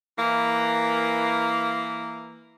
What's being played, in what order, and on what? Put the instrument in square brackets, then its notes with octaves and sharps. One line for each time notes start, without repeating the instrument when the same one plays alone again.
[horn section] E3 A#3